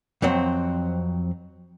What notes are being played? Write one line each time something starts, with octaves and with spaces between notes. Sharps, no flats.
F2 F#3 C4